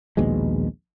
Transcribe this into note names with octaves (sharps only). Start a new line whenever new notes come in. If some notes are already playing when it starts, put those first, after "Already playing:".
A#1 D#2 B2 G#3